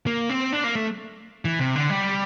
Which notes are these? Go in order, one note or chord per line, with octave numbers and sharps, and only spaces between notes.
A#3
C4
D4
A#3
A3
E3
C3
D3
G3